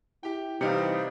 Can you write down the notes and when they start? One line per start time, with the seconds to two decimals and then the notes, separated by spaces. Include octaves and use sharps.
0.23 E4 G4 G5
0.61 C3 E3 G3 C4 D#4 G4 F5 C#7